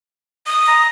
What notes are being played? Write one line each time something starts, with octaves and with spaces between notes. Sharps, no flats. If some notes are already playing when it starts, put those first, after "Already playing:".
D#6
A#5